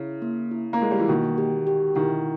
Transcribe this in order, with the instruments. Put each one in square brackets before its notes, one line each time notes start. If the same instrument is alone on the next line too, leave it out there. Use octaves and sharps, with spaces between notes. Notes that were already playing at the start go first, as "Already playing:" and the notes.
Already playing: [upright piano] C#3 [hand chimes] E4
[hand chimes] A#3
E4
[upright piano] A#3
[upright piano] G#3 [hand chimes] E4
[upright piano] G3
E3
[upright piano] B2 D#3 [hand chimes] A#3
[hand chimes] G4
G4
[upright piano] B2 D#3 [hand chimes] E4